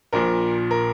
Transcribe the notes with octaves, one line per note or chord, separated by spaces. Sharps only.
A#1 A#2 F3 A#4
A#4